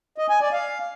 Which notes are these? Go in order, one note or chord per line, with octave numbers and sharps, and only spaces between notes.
D#5
G#5
D5
F5